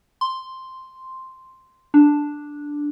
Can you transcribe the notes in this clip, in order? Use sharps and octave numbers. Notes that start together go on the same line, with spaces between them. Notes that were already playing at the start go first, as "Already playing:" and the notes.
C6
D4